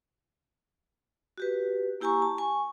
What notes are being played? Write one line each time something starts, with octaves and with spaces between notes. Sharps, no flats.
F#4 G4 B4
A#3 E4 G4 G#5 A#5 C#6
A5
G#5 C#6